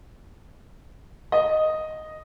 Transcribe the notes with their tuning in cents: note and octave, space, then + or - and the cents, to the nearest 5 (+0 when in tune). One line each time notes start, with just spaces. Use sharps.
D#5 +0